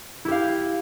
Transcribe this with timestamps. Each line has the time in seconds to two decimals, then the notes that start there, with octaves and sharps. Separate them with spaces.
0.25 E4
0.28 G4
0.31 F5